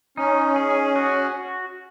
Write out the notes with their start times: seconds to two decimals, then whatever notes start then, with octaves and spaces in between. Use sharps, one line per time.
0.17 C#4 D#4
0.56 G#4
0.96 F#4